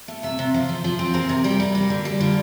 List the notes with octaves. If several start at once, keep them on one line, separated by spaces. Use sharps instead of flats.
A3
C3 E5
C3
F3 C5
F3
F3
C4
C4 A#4
C3
G3 A#4
G3
A#3
D3
G3
D3 F4